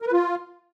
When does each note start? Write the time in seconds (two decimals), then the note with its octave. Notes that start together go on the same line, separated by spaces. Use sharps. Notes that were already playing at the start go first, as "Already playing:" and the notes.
0.02 A#4
0.07 B4
0.12 F4